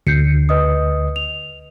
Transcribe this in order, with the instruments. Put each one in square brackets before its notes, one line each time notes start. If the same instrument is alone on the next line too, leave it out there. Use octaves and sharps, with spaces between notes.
[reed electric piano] D2 [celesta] G6 C7 C#7
[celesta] B4 D#5 D#6
F7